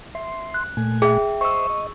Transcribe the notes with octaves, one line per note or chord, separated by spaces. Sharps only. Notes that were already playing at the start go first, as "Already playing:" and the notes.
E5 C6
F#6
A#2 A3 G#5
G#4 E5 G5
C5 D#5 E5 C#6 E6
D#5